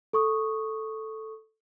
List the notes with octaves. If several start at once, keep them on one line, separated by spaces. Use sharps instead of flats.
A4 C#6 D#6